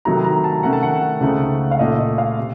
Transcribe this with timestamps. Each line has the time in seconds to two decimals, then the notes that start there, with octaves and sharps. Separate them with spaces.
0.05 C3 D#3 F#3 A3 D#4 A#5
0.24 A#5
0.44 A5
0.63 C3 D#3 A3 C#4 F#5
0.73 A5
0.83 F#5
1.21 C#2 C#3 A3 C4 D#4
1.71 F5
1.79 A#2 A3 C#4 D#5
1.98 D#5
2.18 F5
2.39 C3